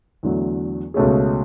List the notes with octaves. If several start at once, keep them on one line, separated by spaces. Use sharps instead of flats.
E2 D3 F#3 A3
C#2 B2 A3 C#4 G#4